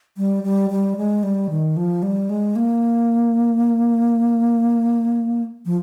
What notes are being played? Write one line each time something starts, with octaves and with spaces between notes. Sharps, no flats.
G3
G3
G3
G#3
G3
D#3
F3
G3
G#3
A#3
F3